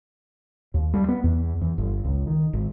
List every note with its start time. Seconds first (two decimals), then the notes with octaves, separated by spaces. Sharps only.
0.74 D#2
0.94 G3
1.09 B3
1.24 E2
1.62 E2
1.78 G1
2.04 C#2
2.27 D#3
2.53 G#1